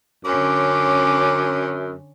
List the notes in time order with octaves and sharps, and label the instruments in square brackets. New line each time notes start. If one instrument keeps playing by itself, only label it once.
[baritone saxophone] F#2 [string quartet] D3 C#4 [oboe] D6